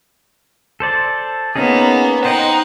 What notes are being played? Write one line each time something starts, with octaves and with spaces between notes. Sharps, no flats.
A4 C5 D5
A#3 B3 C#4 D#4 G#4
D#4 C5 D#5 F#5 G5